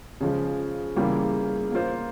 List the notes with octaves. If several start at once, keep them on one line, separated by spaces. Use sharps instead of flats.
C#3 F3 G#3
C#3 E3 G3 A#3 F4
A#3 F4 C5